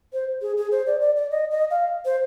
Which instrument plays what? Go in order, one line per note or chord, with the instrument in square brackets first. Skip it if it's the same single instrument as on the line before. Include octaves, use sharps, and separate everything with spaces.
[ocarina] C5
G#4
G#4
C5
D5
D5
D5
D#5
D#5
F5
C5